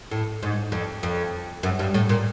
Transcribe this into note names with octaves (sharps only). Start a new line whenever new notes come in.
A2
G#2
F2
F2
F#2
G2
A2
A#2